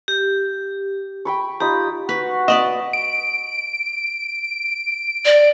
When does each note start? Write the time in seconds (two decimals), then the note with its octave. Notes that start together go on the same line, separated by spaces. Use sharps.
0.08 G4
1.25 G5 B5 C#6
1.60 D#4 F4 G4 B5
2.09 F#4 B4
2.48 B4 D5 D#5 A5
2.93 D7
5.25 D5